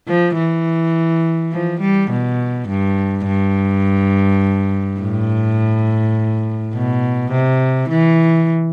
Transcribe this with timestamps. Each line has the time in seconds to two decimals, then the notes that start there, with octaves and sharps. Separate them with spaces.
0.08 F3
0.37 E3
1.52 F3
1.81 G3
2.11 B2
2.69 G2
3.27 G2
5.00 A2
6.74 B2
7.32 C3
7.89 E3